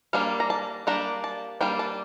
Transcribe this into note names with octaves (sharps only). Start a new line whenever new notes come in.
G3 A#3 D4 F5
A#5
A5
G3 A#3 D4 A#5
A5
G3 A#3 D4 G5
A5